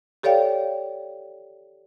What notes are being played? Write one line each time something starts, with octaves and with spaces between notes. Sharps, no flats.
G4 A4 C#5 D5 F5 G5